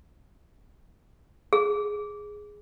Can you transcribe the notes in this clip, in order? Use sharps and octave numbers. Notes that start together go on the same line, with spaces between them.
G#4